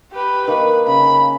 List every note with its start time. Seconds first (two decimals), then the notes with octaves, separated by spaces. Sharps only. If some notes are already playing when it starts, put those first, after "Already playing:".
0.12 G4 B4
0.47 D#3 A#3 B4
0.87 C#3 B5